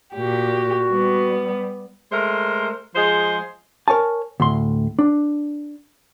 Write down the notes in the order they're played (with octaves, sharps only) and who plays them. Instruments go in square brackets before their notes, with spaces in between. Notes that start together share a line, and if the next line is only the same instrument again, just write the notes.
[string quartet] A#2 G4 [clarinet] F#4
[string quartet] G3 B3
[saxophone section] G#3 A3 A#4 C5
F3 G#3 G#4 C5
[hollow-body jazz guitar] A#4 C#5 G#5 A5
D2 A2 C6
D4